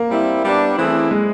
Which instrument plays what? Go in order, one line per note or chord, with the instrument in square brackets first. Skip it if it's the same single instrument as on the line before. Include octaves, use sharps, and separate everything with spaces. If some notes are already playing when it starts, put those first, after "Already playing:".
Already playing: [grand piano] A#3
[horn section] G3 C4 E4
G3 B3 D4
E3 A3 C4 E4 G#4
[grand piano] G#3